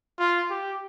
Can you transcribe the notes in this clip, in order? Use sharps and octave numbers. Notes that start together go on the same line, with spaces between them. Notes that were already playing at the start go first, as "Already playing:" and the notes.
F4
G4